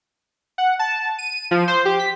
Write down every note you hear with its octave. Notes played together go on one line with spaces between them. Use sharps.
F#5
A5
D#7
F3
C5
G4
B6